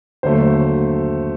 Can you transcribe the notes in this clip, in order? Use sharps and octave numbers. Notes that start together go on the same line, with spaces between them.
D#2 D3 F#3 A3 C5